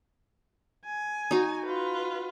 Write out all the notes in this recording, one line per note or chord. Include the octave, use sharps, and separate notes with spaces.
G#5
D#4 F#4
F4 B4